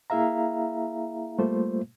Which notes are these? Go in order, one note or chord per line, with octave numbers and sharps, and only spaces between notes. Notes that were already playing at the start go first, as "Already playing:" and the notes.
A#3 E4 G#4 E5 F5 A#5
G3 A3 A#3 F4 C5